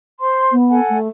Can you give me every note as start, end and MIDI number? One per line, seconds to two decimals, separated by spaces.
0.20 0.54 72
0.20 0.54 84
0.51 0.79 59
0.69 0.97 69
0.69 0.97 78
0.69 0.97 80
0.89 1.08 57